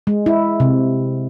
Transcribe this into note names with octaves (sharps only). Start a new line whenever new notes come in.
G#3
E4
C3